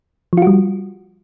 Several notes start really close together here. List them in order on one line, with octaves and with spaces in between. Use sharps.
F3 F4 F#4 G3